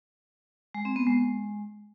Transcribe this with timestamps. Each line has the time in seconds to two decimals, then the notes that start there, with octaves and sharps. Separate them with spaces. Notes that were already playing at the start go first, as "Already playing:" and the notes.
0.74 G#3
0.85 C4
0.96 B3
1.07 G#3